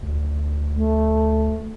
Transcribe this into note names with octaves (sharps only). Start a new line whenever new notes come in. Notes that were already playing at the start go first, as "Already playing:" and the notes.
D2
A3